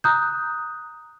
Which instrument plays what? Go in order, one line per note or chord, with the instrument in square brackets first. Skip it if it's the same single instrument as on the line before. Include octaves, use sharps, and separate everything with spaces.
[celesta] A#5 D#6 F#6 G6